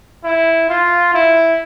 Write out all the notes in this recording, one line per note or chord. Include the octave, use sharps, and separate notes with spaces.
E4
F4
E4